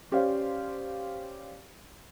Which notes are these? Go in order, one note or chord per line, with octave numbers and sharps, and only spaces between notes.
C#4 G4 C5 D5 F5